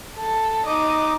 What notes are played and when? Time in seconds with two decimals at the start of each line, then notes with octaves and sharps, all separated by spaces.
0.16 A4
0.66 D#4 D#5 D6